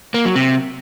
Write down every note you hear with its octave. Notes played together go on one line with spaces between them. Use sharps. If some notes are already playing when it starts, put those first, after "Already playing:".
A#3
F#3
C3